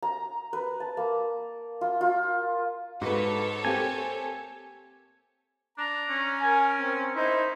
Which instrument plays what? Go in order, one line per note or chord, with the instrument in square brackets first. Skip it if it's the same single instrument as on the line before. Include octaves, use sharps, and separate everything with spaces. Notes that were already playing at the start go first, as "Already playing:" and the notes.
[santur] A#5
B4
A5
A#3
F4
F4
[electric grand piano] G#2 [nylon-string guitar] F#4 B4 [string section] A4 C#5
[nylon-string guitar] A#3 [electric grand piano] C4 G4 [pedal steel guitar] G#5
[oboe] D4 [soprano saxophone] A#5
[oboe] C#4
[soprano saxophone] A#4 [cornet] G#5
[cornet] C4
[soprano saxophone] D#4 [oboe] E4 [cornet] C5